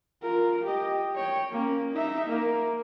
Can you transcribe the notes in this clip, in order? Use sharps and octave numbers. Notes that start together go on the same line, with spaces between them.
F4 A#4
G4 D#5
C#5 G5
A#3 C#4
D#4 E5
A#3 A#4